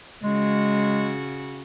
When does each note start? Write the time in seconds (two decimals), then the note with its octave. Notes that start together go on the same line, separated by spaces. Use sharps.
0.23 C#3 G#3 F#4